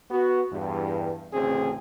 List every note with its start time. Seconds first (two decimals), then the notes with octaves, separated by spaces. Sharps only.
0.11 B3 F#4
0.52 E2 G2
1.33 A1 D2 C#3 C4 G#4